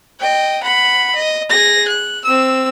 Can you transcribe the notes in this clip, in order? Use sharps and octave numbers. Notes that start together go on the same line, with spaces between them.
D#5 G5
F#5 B5
D#5
G#4 A#6
F#6
C4 E6